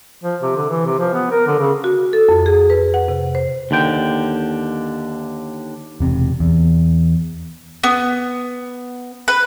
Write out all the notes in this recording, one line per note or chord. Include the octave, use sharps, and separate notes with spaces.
F3
C3
D3
E3
C3
F3
B3
A#4
D3
C#3
F#4
A4
F2
G#4
B4
F#5
C3
C5
D#2 D3 G5
E1 C3
E2
B3
B4